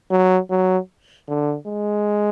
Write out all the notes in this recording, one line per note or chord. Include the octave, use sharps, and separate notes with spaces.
F#3
F#3
D3
G#3